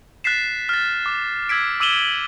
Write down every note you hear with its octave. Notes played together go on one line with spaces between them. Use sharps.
F#6 A6 B6 C7 E7
F6 A6
D6
E6 G#6 B6 D7
D6 E6 D#7 E7 F#7 G7